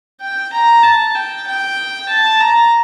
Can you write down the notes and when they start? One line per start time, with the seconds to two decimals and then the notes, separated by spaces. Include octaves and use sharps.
0.20 G5
0.53 A#5
0.83 A5
1.15 G5
1.47 G5
2.09 A5
2.40 A#5